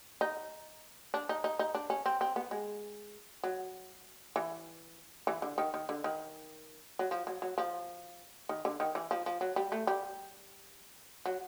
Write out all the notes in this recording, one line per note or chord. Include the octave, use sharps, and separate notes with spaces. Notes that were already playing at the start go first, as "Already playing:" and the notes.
D#4
D4
D#4
D#4
D#4
D4
C#4
C4
C4
B3
G#3
F#3
E3
E3
D3
D#3
D#3
D3
D#3
F#3
F3
F#3
F#3
F3
D#3
D3
D#3
E3
F3
F3
F#3
G3
A3
G3
F#3